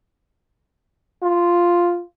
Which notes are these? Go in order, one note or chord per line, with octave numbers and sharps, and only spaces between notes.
F4